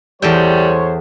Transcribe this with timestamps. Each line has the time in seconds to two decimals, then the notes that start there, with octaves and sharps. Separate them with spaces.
0.22 E2 G3 A4 C5 C#5 G5